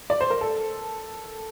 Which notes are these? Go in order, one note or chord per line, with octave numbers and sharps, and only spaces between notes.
D5
C5
A#4
A4